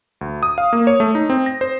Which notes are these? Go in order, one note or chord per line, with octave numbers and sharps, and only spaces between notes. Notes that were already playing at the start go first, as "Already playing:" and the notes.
D2
D#6
F5
A#3
C#5
A3
D#4
C4
A#6
C5